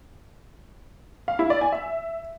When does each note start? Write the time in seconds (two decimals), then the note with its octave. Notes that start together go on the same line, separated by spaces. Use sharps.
1.28 F5
1.39 E4
1.50 D5
1.61 G#5
1.72 E5